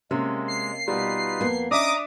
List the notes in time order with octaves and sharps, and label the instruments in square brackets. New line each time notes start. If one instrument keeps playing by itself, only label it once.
[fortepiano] C3 [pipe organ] G#3 [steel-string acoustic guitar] A#3 C#4
[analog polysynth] C7
[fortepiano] B2 G3 [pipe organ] D#4 F4 B4
[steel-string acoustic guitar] F2 A#3 B3
[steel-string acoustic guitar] C#4 [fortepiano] D4 E5 [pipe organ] D#5 A#5 [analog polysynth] D6 D#6